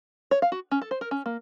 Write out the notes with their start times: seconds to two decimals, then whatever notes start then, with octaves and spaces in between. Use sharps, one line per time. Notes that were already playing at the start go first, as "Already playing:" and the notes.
0.31 C#5
0.42 F5
0.52 F#4
0.71 C#4
0.82 A4
0.91 C5
1.01 A#4
1.11 C#4
1.26 A#3